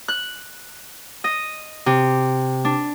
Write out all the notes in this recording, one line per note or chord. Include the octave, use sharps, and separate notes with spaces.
F#6
D#5
C3
D4